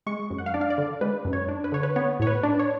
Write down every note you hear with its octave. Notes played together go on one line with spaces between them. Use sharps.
G#3 C#6
F#2
F#5
F5
D4 D5
F5
D5
D3
G#3 B4
F#2
C#5
D4
B4
D3 C#5
B4
B3 C#5
A2 C#5
B4
D4
C#5